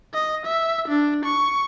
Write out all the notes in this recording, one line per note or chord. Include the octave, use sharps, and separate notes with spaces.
D#5
E5
D4
C#6